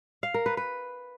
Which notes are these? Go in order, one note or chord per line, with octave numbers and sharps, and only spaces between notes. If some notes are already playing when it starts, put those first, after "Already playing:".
F5
A#4
B4
B4